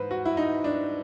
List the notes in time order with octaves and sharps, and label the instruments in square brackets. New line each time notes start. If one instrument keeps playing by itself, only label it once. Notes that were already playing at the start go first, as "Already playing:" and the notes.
Already playing: [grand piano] G#2 E3 B4 C5
F#4
E4
D#4
D4